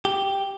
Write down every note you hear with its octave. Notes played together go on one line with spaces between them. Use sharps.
G4